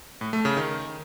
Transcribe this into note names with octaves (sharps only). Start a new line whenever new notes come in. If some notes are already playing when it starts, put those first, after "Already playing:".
A2
A3
C#3
D#3